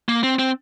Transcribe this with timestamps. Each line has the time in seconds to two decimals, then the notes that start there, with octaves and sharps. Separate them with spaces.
0.09 A#3
0.23 C4
0.39 C4